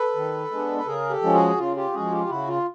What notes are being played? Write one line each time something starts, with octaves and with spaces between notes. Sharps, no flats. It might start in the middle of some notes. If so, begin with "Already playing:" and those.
Already playing: A4 B4
D#3
G#3 B3 D4
B4
C#3 G#4 A#4
G4 A4
F3 G#3 C#4
F#4 G#4
C#3 F4
F4 G4
F3 G#3 C#4 F#4 G#4
F4 G4
G4
C#3 E4 F#4
F4